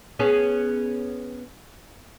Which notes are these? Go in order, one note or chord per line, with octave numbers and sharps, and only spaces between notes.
B3 C#4 G#4